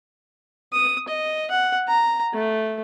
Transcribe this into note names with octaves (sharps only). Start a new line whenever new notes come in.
D#6
D#5
F#5
A#5
A3